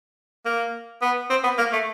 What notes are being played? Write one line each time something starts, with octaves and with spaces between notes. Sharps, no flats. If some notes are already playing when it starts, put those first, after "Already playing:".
A#3
B3
C4
B3
A#3
A3